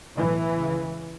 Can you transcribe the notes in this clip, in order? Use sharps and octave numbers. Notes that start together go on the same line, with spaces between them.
B1 A2 E3
C#2 C#3